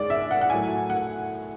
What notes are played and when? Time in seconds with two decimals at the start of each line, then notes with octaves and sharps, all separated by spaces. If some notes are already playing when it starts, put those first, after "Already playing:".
Already playing: G#2 G#3 D5
0.10 E5
0.31 F#5
0.41 F#5
0.50 A2 F#3 A3 G#5
0.90 F#5